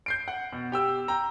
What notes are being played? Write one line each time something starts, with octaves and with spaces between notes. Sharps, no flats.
G6 C7 D7
F#5
B2
G4 G5 E6
G5 A#5